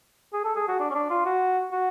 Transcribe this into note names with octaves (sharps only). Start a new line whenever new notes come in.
G#4
A4
G#4
F#4
D4
C#4
D4
F4
F#4
F#4